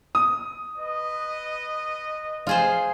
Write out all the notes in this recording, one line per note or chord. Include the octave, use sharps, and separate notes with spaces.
D#6
B4 D#5
F4 G#4 C5